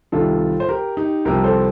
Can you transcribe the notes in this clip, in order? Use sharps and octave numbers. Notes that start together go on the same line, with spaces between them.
C2 C3 D#3 F4 A4
C5
G4 A#4
D#4 G4
C2 C3 F3 G4 A#4
A4 C5